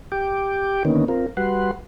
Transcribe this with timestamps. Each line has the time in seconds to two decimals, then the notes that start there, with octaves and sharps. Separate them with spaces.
0.12 G4 G5 D6
0.85 D3 D#3 A#3 B3 C#4 D#4
1.08 C4 F4 A#4
1.37 G3 F#4 B4 F#5 C6